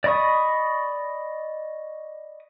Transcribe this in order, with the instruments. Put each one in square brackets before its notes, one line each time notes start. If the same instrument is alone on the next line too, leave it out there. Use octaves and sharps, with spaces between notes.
[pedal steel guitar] D5 D#5 B5 C#6 D#6